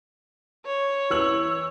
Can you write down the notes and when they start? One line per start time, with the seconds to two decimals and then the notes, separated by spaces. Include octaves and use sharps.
0.65 C#5
1.10 E3 E6 F#7